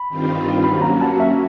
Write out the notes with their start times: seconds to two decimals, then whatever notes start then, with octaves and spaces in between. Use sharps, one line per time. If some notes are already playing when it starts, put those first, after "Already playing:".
Already playing: B5
0.09 G2 D#3 G3 C4 F4
0.64 F#3 A#3 C#4 F#4 B5
0.82 A#5
1.01 A5
1.20 E5